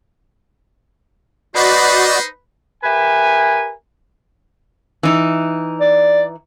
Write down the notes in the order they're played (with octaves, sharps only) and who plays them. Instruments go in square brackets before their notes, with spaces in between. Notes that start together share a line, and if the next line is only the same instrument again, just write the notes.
[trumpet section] D#4 C5 [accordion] F#4 D5 D#5 [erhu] B4
[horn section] G4 A#4 B4 E5 G#5
[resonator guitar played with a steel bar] E3 D#4
[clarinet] D5